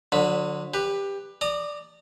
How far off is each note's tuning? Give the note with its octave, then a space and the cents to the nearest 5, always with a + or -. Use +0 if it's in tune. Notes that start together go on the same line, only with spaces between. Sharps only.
D3 +10 F#3 -35 B5 +0
G4 +15 B4 +0
D5 +0 A#5 -20 D#6 -30